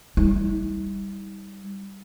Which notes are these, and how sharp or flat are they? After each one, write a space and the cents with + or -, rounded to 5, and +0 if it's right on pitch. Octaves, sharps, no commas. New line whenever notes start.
G3 +5 E4 -45